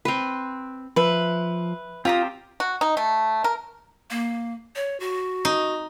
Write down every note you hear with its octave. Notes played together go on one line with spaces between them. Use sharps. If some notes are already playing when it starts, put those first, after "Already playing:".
C4 B4
F3 B4 E5
C4 F4 G4 C5 A#5 D#6
F#4
D#4
A3
A#4
A#3
C#5
F#4
D#4